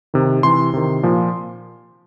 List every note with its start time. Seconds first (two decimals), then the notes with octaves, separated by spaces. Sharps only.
0.14 C3 D#3
0.43 C3 E3 C6
0.74 C3 D#3
1.03 A#2 F3